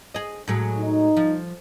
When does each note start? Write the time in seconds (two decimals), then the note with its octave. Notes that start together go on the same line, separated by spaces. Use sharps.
0.14 G#4 D#5
0.48 A2 F#3 G#3
0.77 D#4
1.17 F3